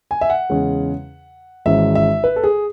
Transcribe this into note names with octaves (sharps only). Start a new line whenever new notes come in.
G#5
E5
F#5
E2 C#3 G#3 C#4
G#1 G#2 E3 G#3 C#4 E5
E5
B4
A4
G#4